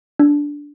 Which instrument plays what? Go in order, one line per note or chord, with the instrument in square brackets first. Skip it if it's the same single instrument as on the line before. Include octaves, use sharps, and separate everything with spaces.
[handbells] D4